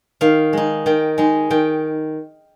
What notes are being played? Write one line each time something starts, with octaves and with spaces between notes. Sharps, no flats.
D#3 F5
G#3 D#4
D#3 G5
G#3 D#4
D#3 G5